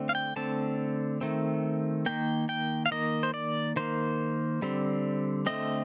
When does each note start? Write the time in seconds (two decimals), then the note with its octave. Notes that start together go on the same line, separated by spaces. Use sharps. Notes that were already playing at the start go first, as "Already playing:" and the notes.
Already playing: D3 A3 C4
0.09 F5
0.15 G5
0.36 D3 A3 C4 A5
1.21 D#3 A3 C4
2.06 D#3 A#3 G5
2.49 G5
2.86 F5
2.91 D#3 A#3 D#5
3.23 C5
3.34 D5
3.76 D#3 A#3 C5
4.62 D3 G3 C4
5.46 D3 A3 C4 D#5